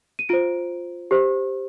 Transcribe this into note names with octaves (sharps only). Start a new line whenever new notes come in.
D#7
F4 C5 D7
G4 C5